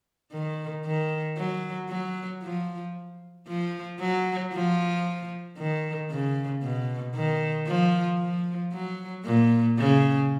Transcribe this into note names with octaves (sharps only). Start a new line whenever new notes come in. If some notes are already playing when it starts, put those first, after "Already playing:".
D#3
D#3
F#3
F#3
F3
F3
F#3
F3
D#3
C#3
B2
D#3
F3
F3
F#3
A#2
C#3